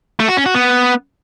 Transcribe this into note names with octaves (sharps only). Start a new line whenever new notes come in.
A3
F#4
C#4
F#4
B3